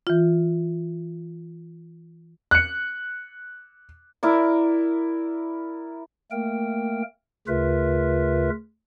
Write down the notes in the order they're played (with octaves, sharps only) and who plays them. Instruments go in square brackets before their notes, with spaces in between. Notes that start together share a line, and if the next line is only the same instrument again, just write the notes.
[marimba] E3 F4
[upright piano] F#6 C#7
[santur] E4 A#4 D5
[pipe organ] A3 A#3 A#4 G5
D2 C#3 F4 A#4 B4 E5